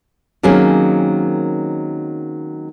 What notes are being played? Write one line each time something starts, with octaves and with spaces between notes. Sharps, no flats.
D#3 F#3 A#3 C4 C#4 G#4